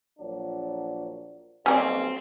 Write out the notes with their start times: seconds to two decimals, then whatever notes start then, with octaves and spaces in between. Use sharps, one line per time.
0.19 A#1 F#3 D4
1.66 B1 D#3 G3 A#3 C4 G#4 D5 G#5